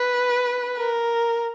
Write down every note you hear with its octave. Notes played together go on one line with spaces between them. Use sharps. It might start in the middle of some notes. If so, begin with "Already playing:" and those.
Already playing: B4
A#4